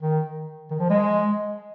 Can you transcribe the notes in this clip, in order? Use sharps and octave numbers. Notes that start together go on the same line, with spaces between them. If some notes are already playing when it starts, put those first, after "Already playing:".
D#3
D#3
F3
G#3